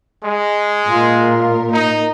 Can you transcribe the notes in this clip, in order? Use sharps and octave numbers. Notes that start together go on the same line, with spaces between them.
G#3
A#2 F4 A#4
D#4